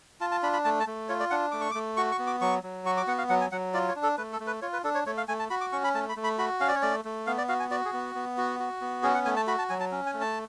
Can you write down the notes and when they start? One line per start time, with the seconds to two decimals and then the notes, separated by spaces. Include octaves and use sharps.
0.21 F4 A5
0.32 A5
0.43 D4 B5
0.53 B5
0.65 A3 A5
0.80 A5
0.87 A3
1.09 F4 C#5
1.20 D5
1.30 D4 F#5
1.51 A3 D6
1.61 C#6
1.71 D6
1.75 A3
1.97 F#4 C#6
2.12 C#6
2.19 B3
2.27 D6
2.41 F#3 C#6
2.63 F#3
2.85 F#4 C#6
2.97 D6
3.07 B3 F#5
3.18 F5
3.29 F#3 F#5
3.41 G#5
3.52 F#3 F#5
3.74 F4 D5
3.88 C#5
3.96 D4
4.03 A4
4.17 A3 B4
4.33 A4
4.40 A3
4.47 B4
4.62 F4 C#5
4.73 B4
4.84 D4 A4
4.95 C#5
5.06 A3 C#5
5.17 F5
5.28 A3 G#5
5.39 A5
5.50 F#4 B5
5.61 D6
5.72 C#4 C#6
5.84 B5
5.94 A3 A5
6.09 B5
6.16 A3
6.24 B5
6.38 F#4 B5
6.60 C#4 F5
6.68 D5
6.75 C#5
6.82 A3 D5
7.05 A3
7.27 B3 F5
7.38 D5
7.49 F#4 F5
7.60 G#5
7.71 F#4 D5
7.85 G#4
7.93 B3
8.15 B3
8.38 F#4
8.60 F#4
8.81 B3
9.03 C#4 G#4
9.15 F#5
9.25 A3 G#5
9.36 A5
9.47 F#4 B5
9.58 A5
9.69 F#3 G#5
9.80 A5
9.92 C#4
10.06 G#5
10.14 A3
10.21 A5